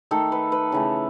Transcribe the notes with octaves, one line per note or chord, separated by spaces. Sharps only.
D#3 A3 A4
B4
B4
C#3 E3 A3